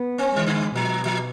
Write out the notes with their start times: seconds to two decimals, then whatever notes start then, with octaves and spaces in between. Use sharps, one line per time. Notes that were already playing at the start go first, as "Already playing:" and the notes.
Already playing: B3
0.18 C4
0.33 D#3 G#3
0.46 D3
0.75 B2 F3
1.05 F3